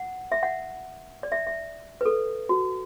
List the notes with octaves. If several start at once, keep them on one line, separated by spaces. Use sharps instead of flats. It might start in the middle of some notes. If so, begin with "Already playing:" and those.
Already playing: F#5
E5
F#5
D5
E5
E5
B4
A4
F#4